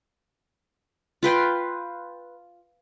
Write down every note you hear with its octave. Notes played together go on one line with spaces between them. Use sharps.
F4 B4 G5 C6